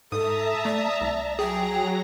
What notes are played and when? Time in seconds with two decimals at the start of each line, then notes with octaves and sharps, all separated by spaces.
0.12 G#2 A4 E5 A5 A#5 D#6
0.65 A3 D5
1.01 C2
1.39 F#3 G#4 G5 A#5 A#6